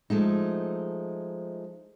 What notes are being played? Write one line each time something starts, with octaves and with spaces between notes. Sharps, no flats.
F3 G#3 A3 D#4